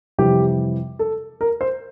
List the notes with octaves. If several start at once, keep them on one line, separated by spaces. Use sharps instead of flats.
F2 C3 E3 G3 G4
A4
A#4
C5